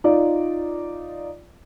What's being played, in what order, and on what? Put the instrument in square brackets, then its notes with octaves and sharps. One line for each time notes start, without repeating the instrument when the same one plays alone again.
[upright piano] D#4 F4 D5